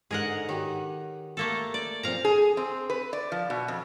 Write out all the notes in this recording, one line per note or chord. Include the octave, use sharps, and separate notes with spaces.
G#2 D3 G#4 A#4 F#5
D#3 F#4 G4 C#5
A3 A#3 A4
D5
A#2 F3 C4 F5 A#5
G#4
C4
B4
D5
F3
B2
F2